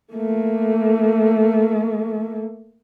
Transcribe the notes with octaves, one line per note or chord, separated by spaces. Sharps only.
A3 A#3